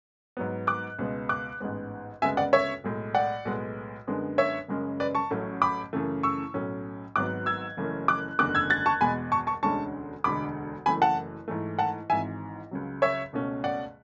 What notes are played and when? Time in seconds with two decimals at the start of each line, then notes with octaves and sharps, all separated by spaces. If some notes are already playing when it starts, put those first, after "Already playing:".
0.37 G#2 F#3 B3
0.67 D6 F#6
0.99 C#2 B2 G#3 B3
1.29 D6 F#6
1.60 A1 G#2 G#3 B3
2.22 D2 C#3 G#3 B3 E5 G#5
2.37 D5 F#5
2.53 C#5 E5
2.84 B1 A2 G#3
3.15 D5 F#5
3.45 B1 A2 G#3 B3
4.07 F#2 D3 G#3 B3
4.38 C#5 E5
4.68 F#1 F#2 C#3 G#3 C#4
5.00 B4 D5
5.15 A5 C#6
5.31 A1 A2 F#3 A3 C#4
5.62 B5 D6
5.93 F#2 C#3 E3 A3
6.23 C#6 E6
6.54 B1 A2 F#3 C#4
7.16 G#1 G#2 F#3 B3 D6 F#6
7.46 E6 G#6
7.77 F#1 F#2 E3 A3 C#4
8.08 D6 F#6
8.39 F#1 E2 D3 A3 D6 F#6
8.55 E6 G#6
8.70 F#6 A6
8.86 A5 C#6
9.01 E1 E2 B2 G#3 G#5 B5
9.32 A5 C#6
9.47 A5 C#6
9.63 E1 D2 D3 G#3 C#4 A5 C#6
10.24 E1 D2 D3 G#3 B5 D6
10.86 F#1 F#2 E3 A3 G#5 B5
11.02 F#5 A5
11.48 G#2 E3 A3
11.79 F#5 A5
12.09 G#1 G#2 E3 E5 G#5
12.71 C#2 C#3 F#3
13.02 C#5 E5
13.33 C#2 B2 A3 C#4
13.64 D5 F#5